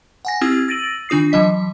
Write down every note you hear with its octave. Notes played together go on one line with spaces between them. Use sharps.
F#5 G#5 A#6
C4 E4 G4 D#6 E6 G#6
E6 A6 A#6 D7 D#7 F#7
D#3 D4 F4 D#6 C7
E3 F#3 D#5 B6